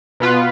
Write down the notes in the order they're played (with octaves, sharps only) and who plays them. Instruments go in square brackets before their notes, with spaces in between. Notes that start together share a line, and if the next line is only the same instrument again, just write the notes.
[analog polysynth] B2 B3 F4 B4